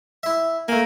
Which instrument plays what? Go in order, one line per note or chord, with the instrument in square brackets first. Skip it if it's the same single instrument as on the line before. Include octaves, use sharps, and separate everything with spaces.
[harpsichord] E4 E5
[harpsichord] A3 G#5 [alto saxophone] A#3